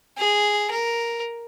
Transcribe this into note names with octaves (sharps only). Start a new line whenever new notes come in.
G#4
A#4